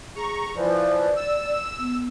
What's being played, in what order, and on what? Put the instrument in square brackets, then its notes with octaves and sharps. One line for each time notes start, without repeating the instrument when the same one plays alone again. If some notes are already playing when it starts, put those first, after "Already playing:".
[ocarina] G#4 [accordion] A#5 C#6
[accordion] E3 F3 [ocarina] D5
[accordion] E6
[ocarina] B3